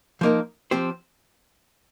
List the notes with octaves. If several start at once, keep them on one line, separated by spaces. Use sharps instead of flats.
F3 A#3 D#4 A#4
F3 C4 G4 C5